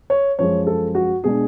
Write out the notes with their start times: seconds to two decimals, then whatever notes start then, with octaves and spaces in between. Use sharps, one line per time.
0.10 C#5
0.38 F#2 F3 G#3 C#5
0.67 A4
0.95 F#4
1.24 B2 G#3 D4 G#4